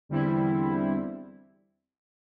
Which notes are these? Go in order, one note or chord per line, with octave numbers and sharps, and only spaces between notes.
E2 D3 G3 C4 E4